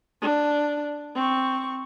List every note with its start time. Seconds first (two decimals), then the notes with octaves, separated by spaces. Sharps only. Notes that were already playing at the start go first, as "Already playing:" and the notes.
0.21 D4
1.16 C4 C#6